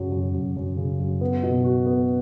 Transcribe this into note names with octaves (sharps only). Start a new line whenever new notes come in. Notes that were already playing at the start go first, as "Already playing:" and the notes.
Already playing: F#2 C#3 F#3
F#2
F#2
F#2
C#3
F#2
B3
B2
F#4
B3